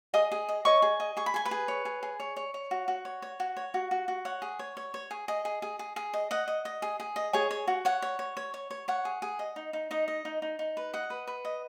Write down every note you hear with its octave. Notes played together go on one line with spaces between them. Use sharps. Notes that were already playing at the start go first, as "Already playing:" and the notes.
G#4 D#5 D#6
G#4
D#5
C#5 D#5 C#6
G#4
D#5
G#4 C#6
B5
G#4 G#5
B4 B5
G#4
C#5
G#4
G#4
C#5
C#5
C#5
F#4
F#4
C#5
C#5
F#4
C#5
F#4
F#4
F#4
C#5 F#5
G#4
C#5
C#5
C#5
G#4
G#4 D#5
G#4
G#4
G#4
G#4
D#5
D#5 F#5
D#5
D#5
G#4
G#4
D#5
G#4 C#5 G#5
C#5
F#4
C#5 F#5
C#5
C#5
C#5
C#5
C#5
C#5 F#5
G#4
G#4
D#5
D#4
D#4
D#4 D#5
D#5
D#4
D#4
D#4
B4
D#5 F#5
B4
B4
D#5